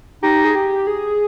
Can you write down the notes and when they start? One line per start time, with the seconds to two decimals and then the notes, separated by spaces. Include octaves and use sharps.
0.23 D#4 G4
0.45 G#4
0.55 G4
0.87 G#4